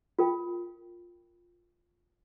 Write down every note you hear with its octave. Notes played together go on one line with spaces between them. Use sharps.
F4 A#4 G5